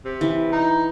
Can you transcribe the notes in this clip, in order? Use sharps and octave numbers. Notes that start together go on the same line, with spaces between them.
C3
E3
D#4